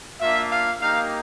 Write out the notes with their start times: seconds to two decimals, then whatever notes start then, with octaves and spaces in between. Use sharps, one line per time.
0.20 A#3 D4 F4 E5
0.51 F5
0.81 A#3 D#4 G4 F5